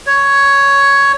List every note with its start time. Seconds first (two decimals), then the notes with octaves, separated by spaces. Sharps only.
0.07 C#5